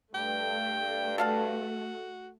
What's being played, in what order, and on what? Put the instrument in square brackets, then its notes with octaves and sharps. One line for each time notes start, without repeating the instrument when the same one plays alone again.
[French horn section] G2 [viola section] A3 [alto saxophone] G5
[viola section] A3 [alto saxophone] F#4 [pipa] A4 F5 A5